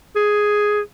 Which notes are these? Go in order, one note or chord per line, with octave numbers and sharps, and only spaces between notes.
G#4